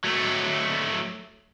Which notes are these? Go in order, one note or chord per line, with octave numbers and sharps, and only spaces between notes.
F#3 A3